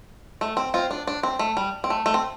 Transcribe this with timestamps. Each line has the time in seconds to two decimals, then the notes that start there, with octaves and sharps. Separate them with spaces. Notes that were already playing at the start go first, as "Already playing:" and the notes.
0.41 A3
0.57 C4
0.74 C4 F4
0.91 D4
1.07 D4
1.23 C4
1.39 A3
1.57 G3
1.84 C4
1.90 A3
2.06 A3
2.14 C4